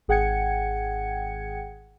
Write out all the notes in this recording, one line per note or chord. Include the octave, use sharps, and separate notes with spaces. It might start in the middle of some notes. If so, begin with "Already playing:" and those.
G#1 G#4 F#5 G5 G#6 C#7